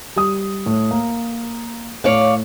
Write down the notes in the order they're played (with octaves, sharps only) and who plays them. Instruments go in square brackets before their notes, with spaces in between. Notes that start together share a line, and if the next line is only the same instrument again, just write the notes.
[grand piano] G3 D#6
A2
A#3
[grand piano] A2 [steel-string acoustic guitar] C#5 D5 F5